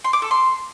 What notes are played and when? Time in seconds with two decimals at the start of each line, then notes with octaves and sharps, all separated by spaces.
0.04 C6
0.13 D6
0.22 A4
0.31 C6